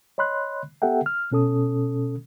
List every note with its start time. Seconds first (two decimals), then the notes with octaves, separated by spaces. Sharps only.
0.18 C#5 D#5 B5 C6 F#6
0.82 B3 G4 A4 E5 F#5 G5
1.06 F6
1.32 B2 C#4 A4 D#6